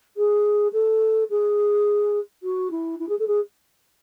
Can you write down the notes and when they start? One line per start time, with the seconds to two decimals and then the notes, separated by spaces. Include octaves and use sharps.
0.16 G#4
0.72 A4
1.30 G#4
2.43 F#4
2.71 E4
2.99 E4
3.08 G#4
3.18 A4
3.27 G#4